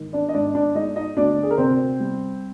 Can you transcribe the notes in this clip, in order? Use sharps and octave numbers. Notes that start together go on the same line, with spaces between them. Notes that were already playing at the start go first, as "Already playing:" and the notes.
Already playing: G#2 D#3
D4 D5
D#5
G#2 D4 D5
D4 D5
G#3 D#4 D#5
D#4 D#5
D2 D4 D5
G#4
A#4
C3 C4 C5
G3